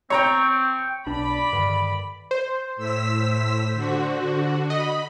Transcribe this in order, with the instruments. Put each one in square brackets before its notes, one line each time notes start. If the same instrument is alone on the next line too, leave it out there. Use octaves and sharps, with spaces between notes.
[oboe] C4 [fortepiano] C#5 A#5 [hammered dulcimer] G5 C#6
[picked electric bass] B1 D4 [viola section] D5 B5
[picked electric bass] G2 D3 D#3
[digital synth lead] C5
[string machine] A2 E6 B6
D3 F#4
[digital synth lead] D#5 [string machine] B5